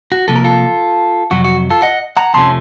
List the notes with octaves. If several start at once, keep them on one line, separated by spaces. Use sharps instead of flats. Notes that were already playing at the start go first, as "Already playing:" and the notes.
F#4
C3 F3 A#3 A4
A#4
F4 A4
F2 C3 F#3 F#4
F#4
F4 A4
D#5 F#5
F#5 A#5
F2 C3 F3 A3 C#4 A5 C6